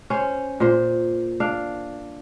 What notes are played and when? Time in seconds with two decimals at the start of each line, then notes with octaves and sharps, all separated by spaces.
0.10 C#4 C5
0.60 A#2 C5
1.40 D4 F5